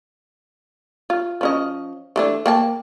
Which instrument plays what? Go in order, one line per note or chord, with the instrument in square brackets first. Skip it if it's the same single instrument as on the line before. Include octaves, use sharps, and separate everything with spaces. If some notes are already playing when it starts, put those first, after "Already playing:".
[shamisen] F4
F3 C#4 D#5
E3 A3 D4
A#3 G5 A5